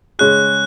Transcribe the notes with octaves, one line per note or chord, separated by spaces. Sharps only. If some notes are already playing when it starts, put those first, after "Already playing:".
C#3 G#3 C#4 G#4 F#6